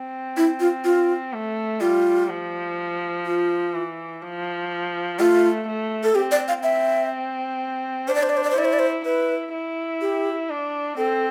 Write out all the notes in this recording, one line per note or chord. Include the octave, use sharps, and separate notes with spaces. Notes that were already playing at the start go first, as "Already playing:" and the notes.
Already playing: C4
E4
F4
F4
A3
G3 F4
F3
F4
E3
F3
A3 F4
A3
A4
C4 G4
D5
F5
C4 E5
D4 C5
D5
C5
D5
C5
D5
C5
E4 D5
C5
D5
C5
E4 B4
E4
G4
D4
C4 A4